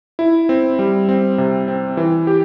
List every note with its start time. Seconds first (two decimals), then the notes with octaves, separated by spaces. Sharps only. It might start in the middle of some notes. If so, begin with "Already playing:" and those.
0.19 E4
0.49 C4
0.79 G3
1.09 C4
1.38 C3
1.68 C4
1.97 E3
2.27 G4